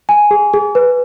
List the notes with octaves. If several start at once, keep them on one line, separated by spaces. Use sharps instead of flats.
G#5
G#4
G#4
B4